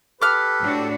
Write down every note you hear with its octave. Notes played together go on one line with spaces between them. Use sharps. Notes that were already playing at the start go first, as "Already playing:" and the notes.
G4 A4 B4 D6 F6 F#6
A2 D4 F#4